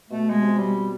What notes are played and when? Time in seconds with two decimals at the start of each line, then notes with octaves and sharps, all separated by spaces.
0.10 B2 A3
0.29 B2 G#3
0.42 C3
0.54 B2 G3